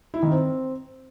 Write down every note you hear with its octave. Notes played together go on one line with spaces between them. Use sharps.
E4
D#3
C4